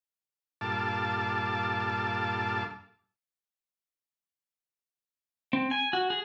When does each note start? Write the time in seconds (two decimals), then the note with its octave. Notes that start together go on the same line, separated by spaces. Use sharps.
0.61 G2 A#2 A4 F5 A5 D6
5.53 C4
5.71 G#5
5.93 F#4
6.10 G#4